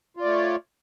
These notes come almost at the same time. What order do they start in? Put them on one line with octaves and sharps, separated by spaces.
F4 D5 A3 C#5